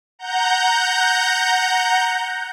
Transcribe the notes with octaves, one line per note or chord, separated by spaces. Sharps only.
F#5 A#5 G6